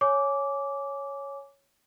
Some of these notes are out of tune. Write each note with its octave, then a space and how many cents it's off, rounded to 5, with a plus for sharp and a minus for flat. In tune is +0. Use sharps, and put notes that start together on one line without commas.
C#5 +0 G#5 +15 D6 -15